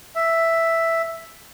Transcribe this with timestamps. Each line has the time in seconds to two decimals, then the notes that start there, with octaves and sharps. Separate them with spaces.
0.15 E5